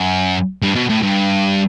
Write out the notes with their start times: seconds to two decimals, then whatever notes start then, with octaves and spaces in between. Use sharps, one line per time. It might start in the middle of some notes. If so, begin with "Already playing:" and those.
Already playing: F#2
0.62 G2
0.76 B2
0.90 A2
1.03 G2